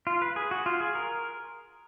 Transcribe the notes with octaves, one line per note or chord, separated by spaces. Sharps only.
F4
B4
G#4
F#4
F4
G#4
A#4